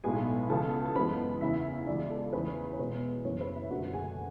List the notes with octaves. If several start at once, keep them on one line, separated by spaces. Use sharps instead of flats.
B1 A2 G#3 B3 G#4 G#5
C#2 C#3 E3 B3 A4 A5
A5
F#2 E3 G#3 B3 B4 B5
E2 C#3 E3 E4 E5
C#2 C#3 E3 G#3 B3 D4 D5
A4
E2 C#3 E3 A3 B4
C#5
E2 B2 G#3 B3 B4
F#1 F#2 E3 B3 C#4 C#5
B4
E4 E5
F#1 F#2 D3 A3 F#4 F#5
G#4 G#5